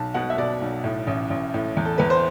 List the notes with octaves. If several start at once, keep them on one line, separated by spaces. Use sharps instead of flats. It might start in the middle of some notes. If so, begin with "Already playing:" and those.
Already playing: B1 A5
B2 F#5
E5
B2 D5
B1
A2
A1
A1
A2
E2
A4
E2 B4
C5